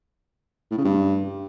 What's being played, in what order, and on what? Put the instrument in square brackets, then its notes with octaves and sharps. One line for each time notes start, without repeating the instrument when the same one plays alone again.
[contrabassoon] A2
C#3
G2